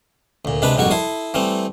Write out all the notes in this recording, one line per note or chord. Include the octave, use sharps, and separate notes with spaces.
D2 A#2
C3 G#3 D4 B4 B5
A#1 F2 G#2 G3 F#4 C#6
E4 A4 C6 D#6
E3 G3 A3 C4